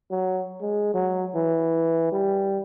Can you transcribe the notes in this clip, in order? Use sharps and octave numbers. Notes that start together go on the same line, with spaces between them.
F#3
G#3
F#3
E3
G3